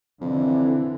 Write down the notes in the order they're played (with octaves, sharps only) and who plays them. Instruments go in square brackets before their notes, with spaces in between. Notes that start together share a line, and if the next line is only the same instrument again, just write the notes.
[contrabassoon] F2 [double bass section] D3 E3